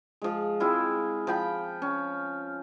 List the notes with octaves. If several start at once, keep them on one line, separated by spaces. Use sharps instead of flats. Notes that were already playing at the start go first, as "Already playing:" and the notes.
F3 G#3
G#3 C4 E4 F4
F3 G5 B5
C#4